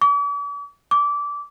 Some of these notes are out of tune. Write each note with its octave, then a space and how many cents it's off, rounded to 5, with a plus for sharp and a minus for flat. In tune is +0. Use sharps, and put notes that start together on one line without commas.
D6 -45
D6 -20